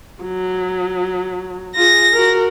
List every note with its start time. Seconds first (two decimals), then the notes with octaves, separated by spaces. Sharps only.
0.23 F#3
1.76 F4 G#4 A#6
2.13 F#4 A#4